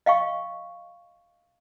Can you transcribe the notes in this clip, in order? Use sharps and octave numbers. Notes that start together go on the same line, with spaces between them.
D#5 F5 G5 C#6